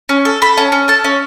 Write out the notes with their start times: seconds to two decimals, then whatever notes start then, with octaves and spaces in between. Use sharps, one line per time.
0.09 C#4
0.25 A4
0.42 A4 B5
0.57 C#4 A5
0.72 C#4
0.88 A4 A5
1.04 C#4